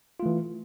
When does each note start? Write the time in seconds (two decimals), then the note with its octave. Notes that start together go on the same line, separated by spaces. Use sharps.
0.20 F4
0.23 A3
0.26 E3